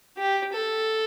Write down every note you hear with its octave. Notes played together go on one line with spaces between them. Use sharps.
G4
A4